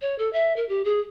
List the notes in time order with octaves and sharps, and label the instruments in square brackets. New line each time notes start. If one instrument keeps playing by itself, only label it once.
[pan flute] C#5
A4
E5
A#4
G4
G#4